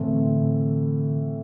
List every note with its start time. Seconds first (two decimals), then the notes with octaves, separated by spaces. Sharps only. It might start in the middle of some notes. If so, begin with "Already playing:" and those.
Already playing: A2 D3 E3 C4 A4